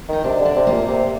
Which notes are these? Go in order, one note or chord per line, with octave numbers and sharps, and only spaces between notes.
D#3 D#4
C3 D4
D3
D4
C3
A#2 A#3
C3